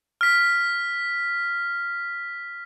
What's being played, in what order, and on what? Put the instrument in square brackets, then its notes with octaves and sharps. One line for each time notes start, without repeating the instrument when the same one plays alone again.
[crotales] F6 B6